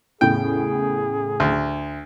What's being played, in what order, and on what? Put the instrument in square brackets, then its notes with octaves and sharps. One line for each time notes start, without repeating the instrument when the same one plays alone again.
[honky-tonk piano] E2 A2 C#3 [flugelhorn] G#4 [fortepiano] G5
[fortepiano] D2